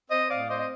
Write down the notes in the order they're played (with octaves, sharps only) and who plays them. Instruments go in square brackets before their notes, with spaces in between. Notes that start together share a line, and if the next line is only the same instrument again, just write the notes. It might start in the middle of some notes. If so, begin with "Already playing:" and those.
[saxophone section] C4 C5 D#5
A2 D5 F5
C4 C5 D#5
D#5